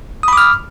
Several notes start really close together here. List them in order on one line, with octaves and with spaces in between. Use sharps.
D#6 B5 D6 F6